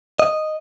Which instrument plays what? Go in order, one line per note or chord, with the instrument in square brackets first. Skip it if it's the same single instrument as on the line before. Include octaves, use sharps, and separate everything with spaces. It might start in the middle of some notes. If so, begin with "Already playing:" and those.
[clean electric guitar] D#5